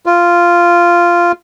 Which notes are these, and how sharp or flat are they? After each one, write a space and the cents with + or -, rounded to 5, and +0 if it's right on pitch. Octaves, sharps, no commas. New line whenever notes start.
F4 -10